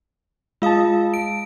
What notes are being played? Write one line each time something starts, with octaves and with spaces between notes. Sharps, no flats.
G#3 F4 F5 A5 D#6
D7